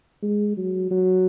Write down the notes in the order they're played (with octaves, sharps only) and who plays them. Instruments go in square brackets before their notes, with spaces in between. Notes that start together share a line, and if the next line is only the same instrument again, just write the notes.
[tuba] G#3
F#3
F#3